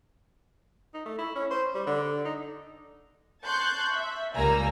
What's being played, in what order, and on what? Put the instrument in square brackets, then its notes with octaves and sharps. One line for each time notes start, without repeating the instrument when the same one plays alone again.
[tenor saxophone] D#4
A3
E4
C#4
C5
G3
D3
D#4
[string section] A5 C6 C#6 F#6 G6
E5
C#2 G3 A#3 G#5 A#5 E6